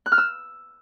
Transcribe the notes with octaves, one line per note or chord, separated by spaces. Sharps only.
F#6
F6
E6